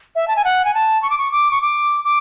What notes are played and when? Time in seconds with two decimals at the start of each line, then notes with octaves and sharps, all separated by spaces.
0.15 E5
0.28 A5
0.36 G#5
0.45 F#5
0.65 G#5
0.75 A5
1.02 C#6
1.10 D6
1.18 C#6
1.32 D6
1.51 C#6
1.62 D6
2.04 D6